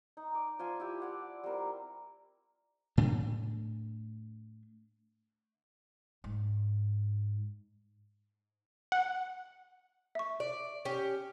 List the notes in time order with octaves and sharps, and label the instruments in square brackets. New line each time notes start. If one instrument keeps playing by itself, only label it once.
[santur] D#4
D5
F3 F5 G#5 C6
E4 G4
D5 F#5 A5
G3 C4 A#4 C6
[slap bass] A2 A3 D4
[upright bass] G#2
[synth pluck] F#5
[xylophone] E5 C#6
[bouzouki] D5
C#4 G4